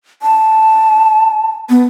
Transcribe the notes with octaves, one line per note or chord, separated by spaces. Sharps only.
A5
B3